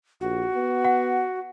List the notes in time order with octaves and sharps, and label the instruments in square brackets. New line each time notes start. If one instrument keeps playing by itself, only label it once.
[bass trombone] A#1 [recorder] F#4
[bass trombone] B3
[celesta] F#5